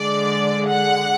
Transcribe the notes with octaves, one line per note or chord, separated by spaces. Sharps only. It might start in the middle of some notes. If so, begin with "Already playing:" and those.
Already playing: D3 G#3 D5
F#5